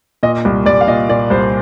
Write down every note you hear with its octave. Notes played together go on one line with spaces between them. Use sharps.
A#2 D#5
C2
C2 D5
F5
A#2 D#5
A#2 D5
C2 C5